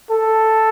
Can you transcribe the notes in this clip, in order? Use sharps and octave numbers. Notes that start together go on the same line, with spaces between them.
A4